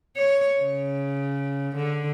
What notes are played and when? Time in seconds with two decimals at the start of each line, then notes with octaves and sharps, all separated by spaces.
0.16 C#5
0.61 C#3
1.76 D3